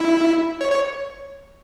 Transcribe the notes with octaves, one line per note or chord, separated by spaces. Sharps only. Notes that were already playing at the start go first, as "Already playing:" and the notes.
Already playing: E4
C#5
C#5